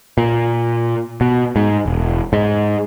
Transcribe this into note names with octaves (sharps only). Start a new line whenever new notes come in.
A#2
B2
G#2
E1
G#2